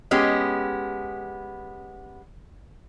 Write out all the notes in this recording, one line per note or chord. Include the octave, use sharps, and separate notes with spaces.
G#3 B3 C#4 G4